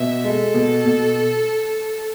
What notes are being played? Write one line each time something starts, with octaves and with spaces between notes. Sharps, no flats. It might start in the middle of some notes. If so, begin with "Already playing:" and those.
Already playing: B2 E5
G#3 A4
B2
B2